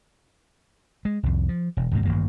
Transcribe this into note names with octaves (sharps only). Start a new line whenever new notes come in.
G#3
C2 F2
F3
E1
D#1 G#2 C3 A#3
A1 G2 D#3 A#3